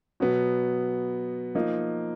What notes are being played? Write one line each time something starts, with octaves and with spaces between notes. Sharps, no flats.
B2 F#3 B3
F3 A#3 D#4